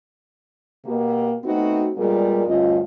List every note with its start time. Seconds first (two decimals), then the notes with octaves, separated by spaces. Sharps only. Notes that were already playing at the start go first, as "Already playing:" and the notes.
0.86 B2 A#3 G4
1.44 A3 B3 C4 D#4 F#4
1.97 A#2 G3 G#3 A#3 B3 G#4
2.47 D2 G2 C#4 F4 D#5